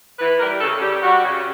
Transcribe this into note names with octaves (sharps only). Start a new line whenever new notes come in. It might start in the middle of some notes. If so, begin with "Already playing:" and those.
E3 B4
G3 A#4
C#3 A4
G3 G4
G3 F#4
C#3